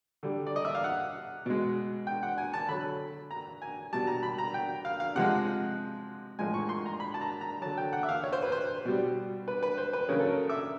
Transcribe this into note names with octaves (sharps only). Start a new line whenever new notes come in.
D3 G3
D5
D#5
E5
F5
F#5
B2 G#3
G5
F#5
G#5
A5
D3 F#3 B5
A#5
G#5
B2 G3 A5
A#5
B5
A#5
G5
F5
F5
C3 F3 G#3 F#5
A2 F3 G#3 G#5
C#6
C6
A#5
B5
A5
A#5
A#5
D3 F#3 A5
G5
F#5
E5
F5
C#5
C5
B4
C5
B2 G3
B4
B4
C5
B4
C#3 F#3 A#4
A4
A#4
E5